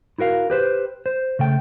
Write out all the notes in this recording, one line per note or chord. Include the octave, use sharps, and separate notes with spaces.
E4 F#4 A#4 F5
G4 B4 C5
C5
C#3 A3 G5